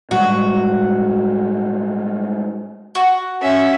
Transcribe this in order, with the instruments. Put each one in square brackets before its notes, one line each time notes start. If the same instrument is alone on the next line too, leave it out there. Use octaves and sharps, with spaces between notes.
[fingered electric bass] A2 G3 G#3 [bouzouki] F#4
[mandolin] F#4
[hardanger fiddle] C#4 E5